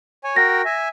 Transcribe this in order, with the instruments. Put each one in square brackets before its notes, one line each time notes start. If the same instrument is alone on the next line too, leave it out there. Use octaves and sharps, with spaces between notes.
[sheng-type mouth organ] C#5 G#5
[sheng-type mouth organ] F#4 A#4 G5 [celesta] A#6
[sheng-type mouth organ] E5 G#5